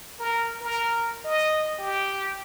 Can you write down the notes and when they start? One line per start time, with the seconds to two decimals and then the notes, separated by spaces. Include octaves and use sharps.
0.19 A#4
0.61 A#4
1.25 D#5
1.79 G4